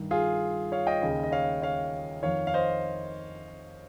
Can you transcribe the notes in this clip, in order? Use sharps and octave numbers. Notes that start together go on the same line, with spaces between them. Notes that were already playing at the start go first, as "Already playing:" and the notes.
Already playing: G2 D#3
F4 G#4
C#5 F5
D#5 G5
D#2 C#3
D#5
C#5 F5
C#5 F5
F2 D#3 C#5 F5
F5
C5 D#5